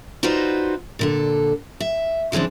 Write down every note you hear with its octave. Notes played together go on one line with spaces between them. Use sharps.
D#4 F4 F#4 B4 C5 D5
A#2 D3 A4
E5
C#3 E3 G#3 C4 D4